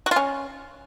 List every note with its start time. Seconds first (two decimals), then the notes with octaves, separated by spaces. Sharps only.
0.06 F#4
0.11 F4
0.16 C#4